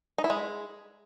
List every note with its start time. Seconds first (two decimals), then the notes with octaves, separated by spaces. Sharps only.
0.18 D#4
0.24 E4
0.30 G#3